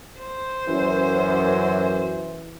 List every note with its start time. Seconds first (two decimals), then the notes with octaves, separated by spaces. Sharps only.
0.19 C5
0.67 F#2 E3